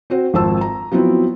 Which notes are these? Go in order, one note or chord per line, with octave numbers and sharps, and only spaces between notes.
C4 F#4 C5
G#1 F2 C5 A5 E6
A#5
F3 F#3 B3 C4 E4